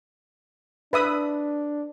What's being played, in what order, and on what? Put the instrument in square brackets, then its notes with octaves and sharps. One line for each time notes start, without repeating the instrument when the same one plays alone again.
[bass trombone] D4 [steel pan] B4 E5 D#6